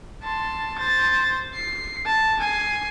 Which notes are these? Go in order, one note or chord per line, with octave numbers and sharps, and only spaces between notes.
A5 C6
C5 A6
C7
A5
G#5 C7